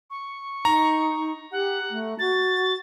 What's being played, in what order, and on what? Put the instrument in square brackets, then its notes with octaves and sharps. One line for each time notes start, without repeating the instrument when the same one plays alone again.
[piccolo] C#6
[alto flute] D#4 [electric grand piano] A#5
[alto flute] G4 [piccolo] F#5
[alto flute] A3
[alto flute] F#4 [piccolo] A6